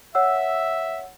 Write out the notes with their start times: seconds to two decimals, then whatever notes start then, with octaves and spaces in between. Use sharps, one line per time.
0.15 C#5 E5 F#5 E6